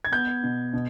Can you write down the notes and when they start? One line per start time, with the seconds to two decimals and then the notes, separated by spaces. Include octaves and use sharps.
0.05 G#6
0.12 B3 G6
0.43 B2
0.73 B2